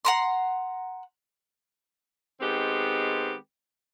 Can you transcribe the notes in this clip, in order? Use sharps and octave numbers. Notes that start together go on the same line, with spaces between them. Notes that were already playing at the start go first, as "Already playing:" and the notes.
F#5 A#5 C6
D#3 G#3 B3 C4 G4